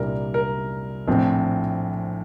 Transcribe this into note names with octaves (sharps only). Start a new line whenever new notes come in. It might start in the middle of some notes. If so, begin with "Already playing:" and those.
Already playing: C2 A#2 G3 D4 A#4
A#4
A#1 A2 F3 C4